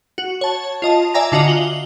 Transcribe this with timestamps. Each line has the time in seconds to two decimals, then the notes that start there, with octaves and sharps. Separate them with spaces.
0.18 F#4
0.41 C#5 A5
0.82 F4 D#5 A5
1.14 D5 E5 G#5 A#5 A#6
1.32 D3 F4 F#4 D#5
1.48 F#7 G7